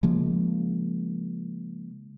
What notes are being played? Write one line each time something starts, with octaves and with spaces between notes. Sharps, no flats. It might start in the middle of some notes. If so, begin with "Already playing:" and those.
C#3 F3 G#3 A#3